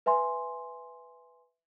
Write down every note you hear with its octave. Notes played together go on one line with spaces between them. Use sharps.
B4 E5 G#5 C6